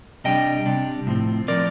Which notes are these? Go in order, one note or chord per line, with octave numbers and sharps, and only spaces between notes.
C3 G3 D4 D#5 G5
C3 G3 D4
A2 F3 C4
A2 F3 C4 A#4 D5